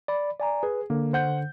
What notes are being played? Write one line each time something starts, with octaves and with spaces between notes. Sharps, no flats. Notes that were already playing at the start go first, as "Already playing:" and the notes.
D5 B5
D5 G#5 A#5
G#4 B4
D3 A#3
C5 F#5 G6